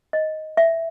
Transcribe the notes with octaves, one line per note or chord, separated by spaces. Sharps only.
D#5
E5